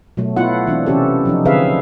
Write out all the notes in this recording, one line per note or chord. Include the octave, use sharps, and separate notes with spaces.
B2 F#3 A3
A3 B3 E4 F4 F#5
E3 C4 D4
C3 E3 C#4 F#4 G4 A4
F3 F#3 D#4
D3 C4 G#4 B4 E5 F5